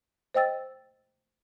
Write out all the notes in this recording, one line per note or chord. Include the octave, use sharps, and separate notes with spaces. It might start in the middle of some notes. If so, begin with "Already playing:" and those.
C5 D#5 G5 E6 A6